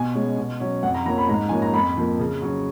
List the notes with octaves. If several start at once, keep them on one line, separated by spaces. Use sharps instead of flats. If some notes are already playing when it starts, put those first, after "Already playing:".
Already playing: B2 G#5
G#3 C#4
B2
F#3 C#4
F2 F#5
A#5
F3 A#3 C#4 A#5
B5
G#2 A#5
F3 A#3 C#4 G#5
A#5
F2 B5
F3 A#3
C#3
F#3 C#4